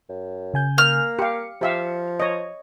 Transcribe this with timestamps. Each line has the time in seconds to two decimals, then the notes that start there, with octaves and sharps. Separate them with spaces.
0.09 F#2
0.54 C#3 G#5 G6
0.78 A#3 F6
1.19 G4 F5 C#7
1.61 F3 G4 E5 F5
2.20 C#5 D#5